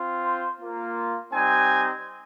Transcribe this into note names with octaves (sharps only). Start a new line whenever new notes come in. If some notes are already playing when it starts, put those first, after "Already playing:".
Already playing: C4 F4
C5
A#3 F4
G3 C4 D#4 G#5